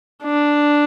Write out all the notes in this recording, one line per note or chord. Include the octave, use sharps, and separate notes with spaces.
D4